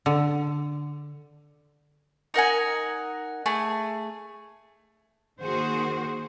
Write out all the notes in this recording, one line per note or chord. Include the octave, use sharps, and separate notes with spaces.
D3
D#4 A#4 F#5 G#5
A3 G#4
D#3 A#3 F#4 G#4 C5